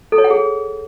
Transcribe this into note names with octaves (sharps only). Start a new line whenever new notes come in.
A4
C#5
F#5
G#4